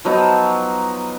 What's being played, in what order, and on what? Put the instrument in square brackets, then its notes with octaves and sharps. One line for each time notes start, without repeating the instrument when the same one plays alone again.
[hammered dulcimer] F3 F#3 B3 D#4